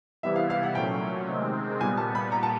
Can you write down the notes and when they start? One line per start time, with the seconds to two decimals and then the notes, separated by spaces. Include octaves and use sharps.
0.23 C3 E3 G3 B3 E4 E5
0.36 F5
0.50 F5
0.63 F#5
0.75 A#2 F#3 A3 C#4 G5
1.28 C3 D#3 G#3 C4
1.80 A#2 G3 B3 G#5
1.97 A5
2.15 B5
2.32 A#5
2.43 A5